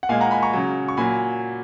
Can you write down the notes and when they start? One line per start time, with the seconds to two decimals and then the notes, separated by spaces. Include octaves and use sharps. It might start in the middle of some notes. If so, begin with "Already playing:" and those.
0.03 F#5
0.09 A#2 G#3 F5 G#5
0.21 F#5 A#5
0.31 G#5 B5
0.42 A#5 C#6
0.53 C#3 F#3
0.88 C#6
0.97 A#2 F#3 G#5 B5